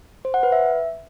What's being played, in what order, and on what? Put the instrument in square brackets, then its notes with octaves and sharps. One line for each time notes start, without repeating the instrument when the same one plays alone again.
[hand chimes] C5
F#5
B4
E5